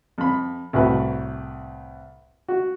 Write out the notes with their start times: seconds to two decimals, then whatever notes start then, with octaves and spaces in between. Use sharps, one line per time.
0.18 F2 B5
0.73 C2 A2 F#4 B4
2.48 F#4